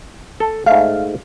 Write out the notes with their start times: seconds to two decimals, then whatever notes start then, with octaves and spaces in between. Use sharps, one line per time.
0.40 A4
0.66 G#2 A3 F5